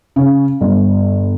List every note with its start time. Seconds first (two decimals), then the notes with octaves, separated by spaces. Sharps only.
0.16 C#3
0.61 G1